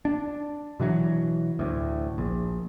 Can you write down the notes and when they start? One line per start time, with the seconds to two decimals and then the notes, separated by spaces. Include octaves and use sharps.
0.05 D4
0.80 B2 E3 F#3
1.59 D2 A2
2.18 A#1